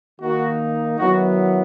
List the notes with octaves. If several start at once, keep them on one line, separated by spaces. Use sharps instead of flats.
D#3 A#3 D#4 F#4
D#3 F#3 B3 E4 F#4